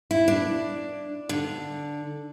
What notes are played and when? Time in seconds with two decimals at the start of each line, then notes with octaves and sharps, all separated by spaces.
0.11 E4
0.28 D4
1.29 D3